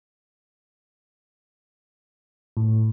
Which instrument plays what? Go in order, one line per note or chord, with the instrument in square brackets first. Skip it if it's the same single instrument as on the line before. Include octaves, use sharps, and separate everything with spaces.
[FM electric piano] A2